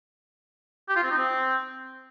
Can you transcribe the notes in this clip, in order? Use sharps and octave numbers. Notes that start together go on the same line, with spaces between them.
G4
F4
C4
D#4
C4